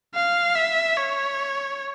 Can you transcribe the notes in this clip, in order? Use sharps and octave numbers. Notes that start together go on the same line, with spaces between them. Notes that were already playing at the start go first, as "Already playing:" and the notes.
F5
E5
C#5